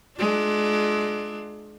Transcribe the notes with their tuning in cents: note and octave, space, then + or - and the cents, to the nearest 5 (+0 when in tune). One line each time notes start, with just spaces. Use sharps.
G#3 +35 D4 +30 F4 +15